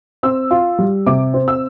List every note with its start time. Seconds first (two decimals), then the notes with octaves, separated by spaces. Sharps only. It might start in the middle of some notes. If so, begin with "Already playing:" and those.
0.23 C4 E6
0.51 F4
0.79 G3
1.06 C3 D6
1.34 C4
1.48 E6